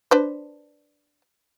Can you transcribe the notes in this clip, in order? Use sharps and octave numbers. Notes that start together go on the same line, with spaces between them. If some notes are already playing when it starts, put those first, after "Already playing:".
D4 B4 C5